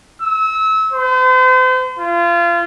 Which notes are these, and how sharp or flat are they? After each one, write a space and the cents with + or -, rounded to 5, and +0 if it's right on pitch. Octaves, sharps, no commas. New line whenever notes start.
E6 -30
C5 -40
F4 -30